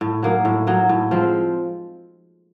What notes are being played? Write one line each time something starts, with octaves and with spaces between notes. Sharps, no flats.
A2
F#3 A#3 D#4
A2
F#3 A#3 D#4
A2
F3 G#3 C4